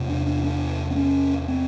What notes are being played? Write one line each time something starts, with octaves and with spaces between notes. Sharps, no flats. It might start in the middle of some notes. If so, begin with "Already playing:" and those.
Already playing: E2 C3
D4
D4
D4
C4
C#4
C4